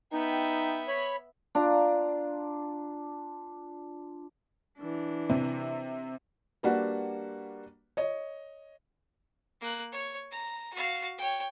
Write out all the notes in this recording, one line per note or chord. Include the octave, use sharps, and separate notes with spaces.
B3 D#4 E5 G5
C#5 B5
D4 F4 A#5
E3 D4
C3
G3 A#3 D4 F#4 B4 F#5
C#5 D#5
A#3 F#6
C#5
A#5
F#4 F5
C#5 G5